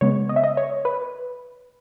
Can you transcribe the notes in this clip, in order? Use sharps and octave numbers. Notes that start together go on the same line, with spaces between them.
C#3 G#3 B3 C#5
D#5
E5
D#5
C#5
B4